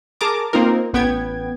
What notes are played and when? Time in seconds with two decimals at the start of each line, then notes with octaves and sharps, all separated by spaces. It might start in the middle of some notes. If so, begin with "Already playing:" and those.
0.21 G#4 A#4 A5 A#5 D6
0.53 A#3 C4 D#4 F4 A#4
0.94 A1 B3 G5 G#6